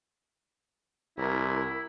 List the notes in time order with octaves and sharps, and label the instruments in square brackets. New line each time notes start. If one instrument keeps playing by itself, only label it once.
[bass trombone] C2 [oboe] E4 [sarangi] A#4